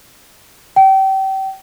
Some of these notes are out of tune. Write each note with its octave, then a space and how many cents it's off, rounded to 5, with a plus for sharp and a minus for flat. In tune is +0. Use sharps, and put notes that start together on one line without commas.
G5 -30